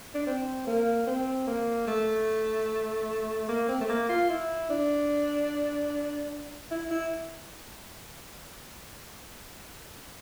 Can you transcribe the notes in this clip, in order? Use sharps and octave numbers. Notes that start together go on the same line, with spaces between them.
D4
C4
A#3
C4
A#3
A3
A#3
C4
A3
A#3
F4
E4
D4
E4
E4